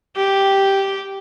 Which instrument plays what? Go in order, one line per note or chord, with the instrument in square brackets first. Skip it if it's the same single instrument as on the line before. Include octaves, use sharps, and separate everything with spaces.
[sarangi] G4